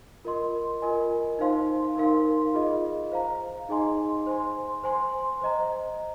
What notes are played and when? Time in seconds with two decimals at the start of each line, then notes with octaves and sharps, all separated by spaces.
0.25 F4 A#4 D#5 C6
0.82 F4 A#4 D#5 G#5
1.39 D#4 C5 F5 C6
1.97 D#4 A#4 F5 C6
2.54 F4 G#4 D#5
3.12 C5 F5 A#5
3.69 D#4 G#4 D#5 G#5 C6
4.27 C5 G#5 C6
4.84 C5 G#5 C6
5.41 C5 D#5 A#5